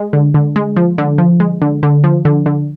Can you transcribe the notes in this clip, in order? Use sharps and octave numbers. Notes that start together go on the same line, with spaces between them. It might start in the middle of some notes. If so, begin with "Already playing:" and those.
Already playing: G#3
D3
D3
G#3
F3
D3
F3
G#3
D3
D3
F3
D3
D3